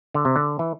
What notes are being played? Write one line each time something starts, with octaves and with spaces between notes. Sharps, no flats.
D3
C3
D3
E3